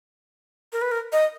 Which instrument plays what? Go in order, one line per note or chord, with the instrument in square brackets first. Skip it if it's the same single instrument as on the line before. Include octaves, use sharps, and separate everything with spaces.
[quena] A#4
B4
A#4
D#5